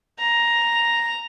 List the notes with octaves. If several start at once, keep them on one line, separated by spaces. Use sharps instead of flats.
A#5